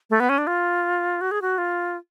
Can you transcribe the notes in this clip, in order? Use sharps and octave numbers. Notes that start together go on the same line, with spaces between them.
A3
B3
C#4
D4
F4
F#4
G#4
F#4
F4